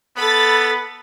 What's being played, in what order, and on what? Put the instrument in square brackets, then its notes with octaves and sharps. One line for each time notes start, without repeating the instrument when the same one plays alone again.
[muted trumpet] B3 [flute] A4 [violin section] B5 A6